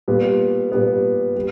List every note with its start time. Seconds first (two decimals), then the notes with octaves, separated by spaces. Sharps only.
0.08 A#2 G3 B3
0.72 A#2 G3 B3
1.36 G3